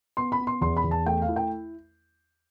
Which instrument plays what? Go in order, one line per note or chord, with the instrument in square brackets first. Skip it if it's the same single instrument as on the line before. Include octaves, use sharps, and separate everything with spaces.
[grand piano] B3 [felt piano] C6
[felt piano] B5
[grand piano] B3
[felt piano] C6
[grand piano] E2 [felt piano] C6
[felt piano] B5
[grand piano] E2
[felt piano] A5
[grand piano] A3 [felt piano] G5
[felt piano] F5
[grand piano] E4
[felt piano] G5